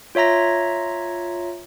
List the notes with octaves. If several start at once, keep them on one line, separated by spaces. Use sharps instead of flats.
F4 C#5 E5 A#5 A#6